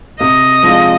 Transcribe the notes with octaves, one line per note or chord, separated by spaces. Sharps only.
C3 D#5
F3 G#3 D4 F4